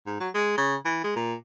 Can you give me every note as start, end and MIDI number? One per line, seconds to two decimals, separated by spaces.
0.06 0.20 44
0.20 0.29 54
0.34 0.56 56
0.58 0.75 49
0.85 0.99 52
1.04 1.11 56
1.16 1.34 46